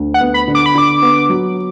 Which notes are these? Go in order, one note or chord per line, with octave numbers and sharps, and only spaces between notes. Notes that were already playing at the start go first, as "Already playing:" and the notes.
Already playing: D2
F#5
B3
B5
D3
D6
B5
D3 D6
B3
F#3